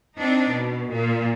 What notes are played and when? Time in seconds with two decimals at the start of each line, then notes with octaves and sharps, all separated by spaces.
0.17 C4 D4 D#4
0.50 B2
0.90 A#2